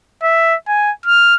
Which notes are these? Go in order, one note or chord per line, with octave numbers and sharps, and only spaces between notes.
E5
G#5
F6